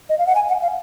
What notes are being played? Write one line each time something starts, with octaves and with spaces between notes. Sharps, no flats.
D#5
F5
F#5
G#5
F#5
F5